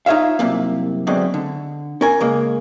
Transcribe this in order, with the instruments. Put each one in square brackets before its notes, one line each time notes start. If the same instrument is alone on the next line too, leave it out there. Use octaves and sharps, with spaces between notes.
[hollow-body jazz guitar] D#4 F4 C#5 E5 F5
C2 F#2 C3 A#3
F#2 B2 D3 G#3 C4
D3
C#4 A#4 G#5
C#3 G#3 A#3